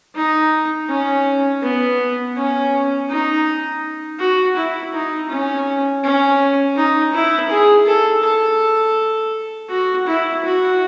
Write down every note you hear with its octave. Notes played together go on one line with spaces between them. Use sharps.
D#4
C#4
B3
C#4
D#4
F#4
E4
D#4
C#4
C#4
D#4
E4
G#4
A4
A4
F#4
E4
F#4